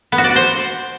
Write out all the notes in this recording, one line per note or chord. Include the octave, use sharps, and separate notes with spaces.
B3
F#4
D5
F#4
C5